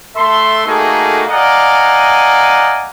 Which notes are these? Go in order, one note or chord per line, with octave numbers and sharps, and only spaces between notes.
A3 A4 E5 C6
A3 A#3 D#4 F#4 G#4 A4
D5 D#5 F5 F#5 G#5 A#5